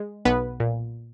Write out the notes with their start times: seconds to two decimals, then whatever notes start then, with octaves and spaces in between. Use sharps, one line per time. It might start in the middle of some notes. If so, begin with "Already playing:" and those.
Already playing: G#3
0.25 B1 B3 B4
0.60 A#2